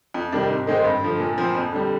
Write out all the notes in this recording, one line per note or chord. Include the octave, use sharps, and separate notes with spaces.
F2
C3 D#3 G3 D4
G#2
D#3 G#3 C4 D#4
G2
D3 F3
A#2
F3 C4
F2
D3 G3